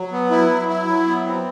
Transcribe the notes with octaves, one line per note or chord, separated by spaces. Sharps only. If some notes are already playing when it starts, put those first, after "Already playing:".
Already playing: F#3
B3
E4
F#3
E4
F#3
B3
C4